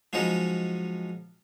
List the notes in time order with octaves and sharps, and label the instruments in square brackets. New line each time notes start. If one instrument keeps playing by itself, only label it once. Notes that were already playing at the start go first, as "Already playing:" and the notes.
[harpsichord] F3 F#3 G#3 C#4 D#4